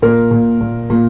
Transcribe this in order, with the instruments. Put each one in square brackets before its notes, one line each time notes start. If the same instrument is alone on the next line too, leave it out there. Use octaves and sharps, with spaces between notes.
[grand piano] A#2 A#4
A#2
A#2
A#2